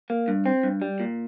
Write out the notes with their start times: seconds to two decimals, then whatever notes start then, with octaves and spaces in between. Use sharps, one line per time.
0.10 A#3
0.28 G2
0.46 C4
0.63 G2
0.82 G3
1.00 A#2